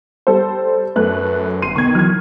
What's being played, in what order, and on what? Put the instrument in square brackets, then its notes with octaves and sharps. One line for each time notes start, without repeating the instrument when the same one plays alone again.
[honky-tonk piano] G3 A4 C5
[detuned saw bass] F#2 [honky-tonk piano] A3 B4 F#6
[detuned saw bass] G1 [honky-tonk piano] C6 C7 D#7
[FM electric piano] C2 B3 [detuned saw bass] D#3 [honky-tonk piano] C#6 G#6
[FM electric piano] E3 F#3 [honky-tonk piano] F6 G#6